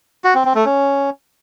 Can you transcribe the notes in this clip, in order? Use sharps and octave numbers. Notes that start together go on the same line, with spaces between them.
F#4
C4
C4
A3
C#4